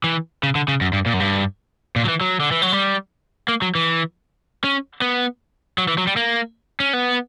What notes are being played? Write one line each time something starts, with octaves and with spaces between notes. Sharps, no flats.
E3
C#3
D3
C#3
F#2
G2
A#2
F#2
G2
A#2
F#3
E3
F#3
D3
E3
F#3
G3
A#3
F#3
E3
C#4
B3
F#3
E3
F#3
G3
A#3
C#4
B3